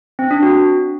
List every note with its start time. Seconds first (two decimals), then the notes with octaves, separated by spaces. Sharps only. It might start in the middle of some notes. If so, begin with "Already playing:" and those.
0.19 C4
0.31 D4
0.43 F#4